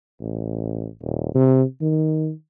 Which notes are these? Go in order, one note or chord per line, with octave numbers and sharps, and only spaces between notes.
A1
D#1
C3
D#3